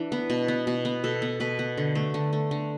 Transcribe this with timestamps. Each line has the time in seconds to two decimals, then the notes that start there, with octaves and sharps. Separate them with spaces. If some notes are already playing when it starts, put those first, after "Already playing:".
Already playing: E3 D4
0.12 B3
0.30 B2
0.48 B3
0.67 B2
0.85 B3
1.04 B2 A4
1.22 B3
1.40 B2 B4
1.59 B3
1.78 D3
1.95 A3
2.14 D3
2.33 A3
2.51 D3